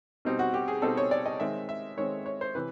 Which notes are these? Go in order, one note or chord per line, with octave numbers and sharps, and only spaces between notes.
B2 G3 C4 D#4
F#4
G4
G#4
B2 G3 C4 D#4 A4
C#5
D5
D#5
D#3 G#3 C4 E5
E5
D#3 G#3 C4 C#5
C#5
C5
C3 E3 B4